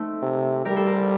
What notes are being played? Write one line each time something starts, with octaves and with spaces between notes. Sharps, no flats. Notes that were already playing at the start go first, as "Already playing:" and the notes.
Already playing: A3 C4 D#4
C3
G3 G4 A#4
A4 C5
A#4 D5